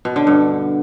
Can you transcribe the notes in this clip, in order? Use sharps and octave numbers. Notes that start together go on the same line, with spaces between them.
B2
D3
G2